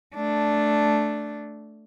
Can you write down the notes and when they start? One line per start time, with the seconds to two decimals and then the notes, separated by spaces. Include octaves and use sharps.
0.15 A3 D4